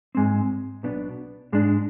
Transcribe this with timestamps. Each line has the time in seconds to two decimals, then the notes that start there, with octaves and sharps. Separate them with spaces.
0.15 G#2 G#3 C4
0.83 B1 B2 B3 D4
1.52 G#2 G#3 D4